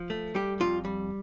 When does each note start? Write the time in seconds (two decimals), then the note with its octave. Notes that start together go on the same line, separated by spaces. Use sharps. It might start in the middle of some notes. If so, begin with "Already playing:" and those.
Already playing: F3
0.10 A3
0.35 G3 G4
0.60 F2 F4
0.85 G3